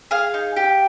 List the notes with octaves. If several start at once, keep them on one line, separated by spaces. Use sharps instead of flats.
G#4 F5
D#4
G4